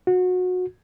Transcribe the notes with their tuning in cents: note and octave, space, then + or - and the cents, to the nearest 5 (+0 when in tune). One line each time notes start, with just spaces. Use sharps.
F#4 -25